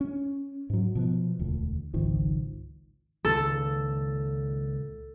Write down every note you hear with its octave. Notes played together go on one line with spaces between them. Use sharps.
C#4
G#2 F#3
B2 F3 B3
E1 D2
G#1 C#2 D#3 F3
C#2 A#2 D#3 A4